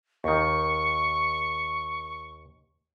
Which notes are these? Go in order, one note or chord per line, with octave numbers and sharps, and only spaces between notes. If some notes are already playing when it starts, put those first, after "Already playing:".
D#2 D#3 C#6